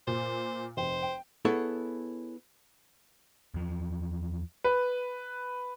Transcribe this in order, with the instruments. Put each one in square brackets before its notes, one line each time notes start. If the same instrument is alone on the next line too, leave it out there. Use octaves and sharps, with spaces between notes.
[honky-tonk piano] A#2 [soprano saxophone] C5
[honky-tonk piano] F1 G5 [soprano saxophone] C5
[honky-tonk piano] G5
[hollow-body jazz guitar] B3 E4 G#4 A4 C#5
[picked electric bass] E2 F3
[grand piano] B4